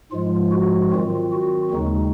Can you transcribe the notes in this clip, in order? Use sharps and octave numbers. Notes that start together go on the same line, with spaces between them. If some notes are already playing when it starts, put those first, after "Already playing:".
G#2 F3 G#3 F4
F#4
D#3 F#3 C4 F4
F#4
D#2 C#3 G#3 D#4